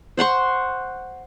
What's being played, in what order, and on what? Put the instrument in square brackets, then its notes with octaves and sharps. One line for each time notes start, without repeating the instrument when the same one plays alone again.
[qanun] C5 F#5 C6 C#6